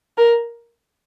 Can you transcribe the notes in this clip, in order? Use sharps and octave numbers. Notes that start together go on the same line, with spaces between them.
A#4